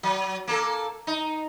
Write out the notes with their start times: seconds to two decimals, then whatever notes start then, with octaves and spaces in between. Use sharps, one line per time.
0.03 F#3
0.48 A#3 A4
1.07 D#4